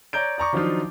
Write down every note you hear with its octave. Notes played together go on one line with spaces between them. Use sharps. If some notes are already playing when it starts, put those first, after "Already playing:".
C#5 D5 A#5 G6 D7
D5 A#5 C#6 D6
D#3 F3 F#3 D4 D#4 F4